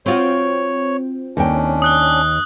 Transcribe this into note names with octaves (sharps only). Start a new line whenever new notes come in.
C4 F4 F#4 C#5
D#2 C#4 D4 G5
D#6 F#6 G7